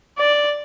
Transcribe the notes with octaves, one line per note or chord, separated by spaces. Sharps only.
D5